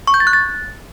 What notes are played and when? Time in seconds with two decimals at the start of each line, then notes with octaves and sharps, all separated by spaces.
0.07 C#6
0.14 G6
0.20 A6
0.27 F#6
0.33 A6